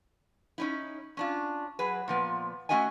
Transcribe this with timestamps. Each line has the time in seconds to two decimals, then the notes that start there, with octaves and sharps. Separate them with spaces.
0.58 C#4 D#4 E4
1.17 C#4 D4 F4
1.79 F#3 G#4 B4
2.08 A#2 F3 B3
2.69 A3 C#4 F#4 D#5 E5 G#5